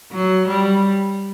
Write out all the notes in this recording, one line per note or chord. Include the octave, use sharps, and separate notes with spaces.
F#3
G3